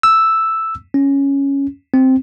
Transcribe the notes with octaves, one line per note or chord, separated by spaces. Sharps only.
E6
C#4
C4